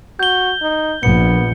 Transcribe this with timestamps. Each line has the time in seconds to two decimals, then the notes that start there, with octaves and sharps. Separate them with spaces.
0.19 F#4 G6 G7
0.62 D#4
1.03 A#1 B3 C#7